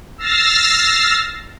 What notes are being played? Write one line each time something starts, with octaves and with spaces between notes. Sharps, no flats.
E6 F6 A6 A#6 C7